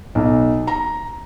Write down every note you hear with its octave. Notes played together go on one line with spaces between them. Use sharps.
B1
A#5